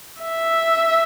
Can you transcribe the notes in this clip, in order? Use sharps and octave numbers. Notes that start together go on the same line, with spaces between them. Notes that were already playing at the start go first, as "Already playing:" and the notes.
E5